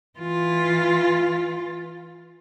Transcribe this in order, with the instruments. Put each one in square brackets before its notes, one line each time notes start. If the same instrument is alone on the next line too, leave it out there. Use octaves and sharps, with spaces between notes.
[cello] E3 F4